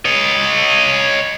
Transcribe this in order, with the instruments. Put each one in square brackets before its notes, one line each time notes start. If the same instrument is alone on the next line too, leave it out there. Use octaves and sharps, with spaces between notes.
[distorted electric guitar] C#5 D#5